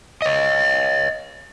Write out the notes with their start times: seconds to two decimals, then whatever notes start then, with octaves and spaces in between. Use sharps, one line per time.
0.22 C#5 D#5